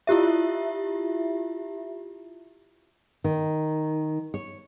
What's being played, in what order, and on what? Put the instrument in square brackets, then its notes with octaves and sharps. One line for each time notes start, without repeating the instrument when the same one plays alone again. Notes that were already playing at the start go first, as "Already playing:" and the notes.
[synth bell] E4 F4 G4 E5
[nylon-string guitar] D#3
C#5